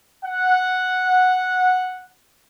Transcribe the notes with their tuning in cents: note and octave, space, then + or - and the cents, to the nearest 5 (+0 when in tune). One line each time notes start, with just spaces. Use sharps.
F#5 -5